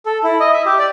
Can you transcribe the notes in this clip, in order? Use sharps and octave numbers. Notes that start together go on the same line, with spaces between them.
A4
E4
D#5
E5
G4
D5